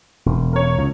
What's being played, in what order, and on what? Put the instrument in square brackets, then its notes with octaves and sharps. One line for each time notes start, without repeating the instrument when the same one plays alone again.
[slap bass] E1
[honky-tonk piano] A#4 C#5
[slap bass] C#2